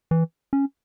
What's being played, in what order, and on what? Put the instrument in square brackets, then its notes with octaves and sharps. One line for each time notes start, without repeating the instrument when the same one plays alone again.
[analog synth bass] E3
C#4